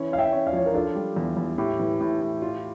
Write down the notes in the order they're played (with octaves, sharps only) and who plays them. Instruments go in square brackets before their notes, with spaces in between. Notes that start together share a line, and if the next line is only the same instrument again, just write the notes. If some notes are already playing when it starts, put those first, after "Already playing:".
Already playing: [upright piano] E3 C#4
[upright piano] C#4 [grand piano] F5
[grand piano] E5 G5
[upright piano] C#4
[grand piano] D5 F5
[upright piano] F3 [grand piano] C#5
[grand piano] A#4
[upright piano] D4 [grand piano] F4 A4
[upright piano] G3
E2
E2
[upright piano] A2 [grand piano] G4
[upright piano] E3
A2
A2
F4